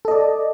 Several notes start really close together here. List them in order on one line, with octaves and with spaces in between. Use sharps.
A4 D#5 D5